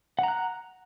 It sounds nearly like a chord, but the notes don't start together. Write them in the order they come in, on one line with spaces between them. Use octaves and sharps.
F#5 A#5 F#6